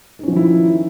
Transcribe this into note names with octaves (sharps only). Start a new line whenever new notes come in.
D#3 F3 C#4 D#4 E4